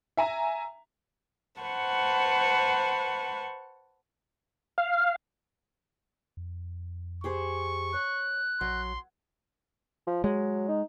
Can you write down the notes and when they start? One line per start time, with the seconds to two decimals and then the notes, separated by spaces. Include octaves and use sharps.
0.17 E5 G#5 A#5
1.61 B4 C5 F#5 A5 C#6
4.78 F5
6.37 F2
7.24 G4 G#4 C5 C#6
7.93 C#5 F#6
8.61 A#1 F#3 C6
10.07 F3
10.24 F#3 G#3
10.68 D#4